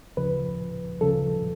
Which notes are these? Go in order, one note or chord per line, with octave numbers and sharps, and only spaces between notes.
D2 C#3 F3 B4
D2 C#3 F3 A4